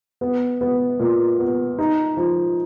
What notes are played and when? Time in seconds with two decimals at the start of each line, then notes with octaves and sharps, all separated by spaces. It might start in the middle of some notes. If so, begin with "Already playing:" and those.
0.21 B3
0.61 B3
0.99 A#2
1.39 B3
1.79 D#4
2.17 F3